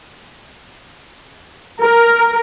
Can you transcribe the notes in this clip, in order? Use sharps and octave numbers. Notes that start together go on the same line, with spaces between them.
A#4